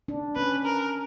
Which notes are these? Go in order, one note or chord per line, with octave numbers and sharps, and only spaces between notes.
D4
C#4 B4
A#4